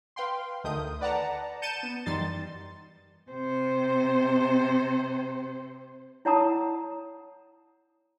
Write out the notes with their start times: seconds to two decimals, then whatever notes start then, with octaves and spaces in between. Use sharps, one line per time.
0.16 B4 F5 G5 C6
0.64 D2 D#3 A3 A#4 D#6 G6
1.00 B4 D5 F#5 A5 A#5
1.62 A5 G6 C#7 D#7 E7
1.83 B3
2.06 F#2 E3 G3 D#4 C6 A6
3.31 C3 C5
6.25 E4 C#5 F#5 A5 A#5 D#6